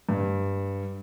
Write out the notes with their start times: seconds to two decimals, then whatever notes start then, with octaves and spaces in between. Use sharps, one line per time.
0.09 G2